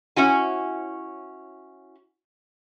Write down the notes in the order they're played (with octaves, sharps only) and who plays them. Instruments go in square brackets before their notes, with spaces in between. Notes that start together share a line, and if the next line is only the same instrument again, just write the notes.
[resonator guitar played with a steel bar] C#4 E4 F#4 G#5